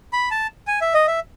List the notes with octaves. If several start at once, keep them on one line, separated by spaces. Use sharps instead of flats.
B5
A5
G#5
E5
D#5
E5